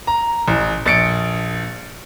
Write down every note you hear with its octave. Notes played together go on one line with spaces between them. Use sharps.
A#5
A1
A#1 A6 C#7 D7